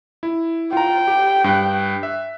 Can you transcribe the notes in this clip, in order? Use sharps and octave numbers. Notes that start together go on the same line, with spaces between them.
E4
F4 G5 A#5
G4
G2 F#6
E5